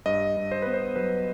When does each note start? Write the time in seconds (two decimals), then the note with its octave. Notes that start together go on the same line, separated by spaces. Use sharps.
0.06 G2 D#5
0.37 G2
0.51 C5
0.62 B3 B4
0.74 C5
0.96 F#3 B4